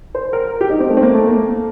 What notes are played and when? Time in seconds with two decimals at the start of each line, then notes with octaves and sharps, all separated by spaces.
0.15 C5
0.33 A#4
0.61 G4
0.70 D#4
0.80 C4
0.89 A3
0.97 C4
1.02 A#3
1.14 A3
1.27 A#3